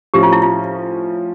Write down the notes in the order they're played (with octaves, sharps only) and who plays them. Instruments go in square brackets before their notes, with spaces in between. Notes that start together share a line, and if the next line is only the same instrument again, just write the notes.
[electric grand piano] A2 F3 C#4 [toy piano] G4
[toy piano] F4
E4
F4